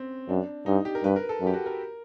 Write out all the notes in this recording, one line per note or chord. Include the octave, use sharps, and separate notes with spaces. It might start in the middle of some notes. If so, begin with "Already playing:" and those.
Already playing: C4 C#4
F#2 D4
G2 D#4
G4
A#4
G2 B4
A#4
A4
F#2
G4
F#4
A#4